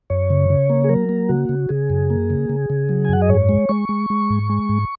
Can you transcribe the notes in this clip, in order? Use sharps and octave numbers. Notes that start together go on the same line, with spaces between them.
F#2 C#5
C#3
C#3
A#3
G#4
F#3 A#4
A#3
C#3 F#4
C#3
C#3 G#4
F#2
A#3
C#3
C#3
C#3
F#3
G#5
F#2 F#5
D#5
G#2 C#5
G#3
G#3 C#6
G#3
G#3
G#2
G#3
G#2